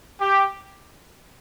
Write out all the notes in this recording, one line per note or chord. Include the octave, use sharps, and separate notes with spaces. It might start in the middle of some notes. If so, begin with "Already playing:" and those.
G4